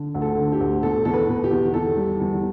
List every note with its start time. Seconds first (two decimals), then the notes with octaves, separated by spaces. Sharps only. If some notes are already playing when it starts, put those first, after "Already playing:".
Already playing: D3
0.15 D2
0.22 A4
0.37 D3
0.52 G4
0.60 D2
0.83 B2 A4
1.05 E2 A4
1.14 B4
1.29 B2
1.44 G4
1.51 E2
1.74 E2 A4
1.96 G3
2.20 E2